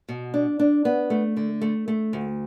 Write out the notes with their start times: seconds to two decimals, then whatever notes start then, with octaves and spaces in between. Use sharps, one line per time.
0.09 B2
0.34 D4
0.60 D4
0.85 B3
1.10 A3
1.37 D3
1.62 A3
1.88 A3
2.13 D2